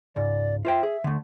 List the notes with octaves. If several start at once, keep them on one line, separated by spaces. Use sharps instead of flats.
C#2 G#2 D5
F4 C5 E5 G5
G#4
D3 A3